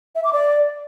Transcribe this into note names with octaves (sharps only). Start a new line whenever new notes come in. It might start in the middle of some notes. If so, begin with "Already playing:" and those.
E5
D6
D5